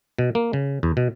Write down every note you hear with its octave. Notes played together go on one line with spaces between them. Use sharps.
B2
A#3
C#3
E2
B2